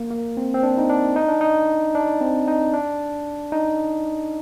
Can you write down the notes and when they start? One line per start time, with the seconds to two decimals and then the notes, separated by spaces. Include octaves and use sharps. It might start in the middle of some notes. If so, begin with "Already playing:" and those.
Already playing: A#3
0.11 A#3
0.37 C4
0.54 C4
0.63 D4
0.78 D#4
0.89 D4
1.16 D#4
1.28 D4
1.41 D#4
1.95 D4
2.21 C4
2.48 D#4
2.74 D4
3.52 D#4